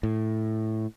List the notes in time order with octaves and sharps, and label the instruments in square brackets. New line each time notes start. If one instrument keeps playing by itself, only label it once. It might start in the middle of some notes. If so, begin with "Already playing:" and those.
[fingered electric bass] A2